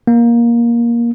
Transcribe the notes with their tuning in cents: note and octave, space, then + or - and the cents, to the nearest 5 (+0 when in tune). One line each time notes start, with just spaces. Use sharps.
A#3 +15